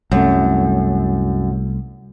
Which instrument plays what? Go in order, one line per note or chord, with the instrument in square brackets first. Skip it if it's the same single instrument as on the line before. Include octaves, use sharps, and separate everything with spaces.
[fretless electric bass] C2 A3 [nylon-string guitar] F#2